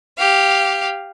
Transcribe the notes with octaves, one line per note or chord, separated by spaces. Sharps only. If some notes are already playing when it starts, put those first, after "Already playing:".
G4 F5